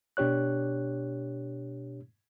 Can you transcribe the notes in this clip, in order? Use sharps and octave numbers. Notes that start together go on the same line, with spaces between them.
B2 D4 G4 C#5 F#6